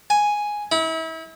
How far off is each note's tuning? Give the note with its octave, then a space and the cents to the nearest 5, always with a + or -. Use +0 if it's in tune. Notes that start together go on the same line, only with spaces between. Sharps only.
G#5 +0
E4 -35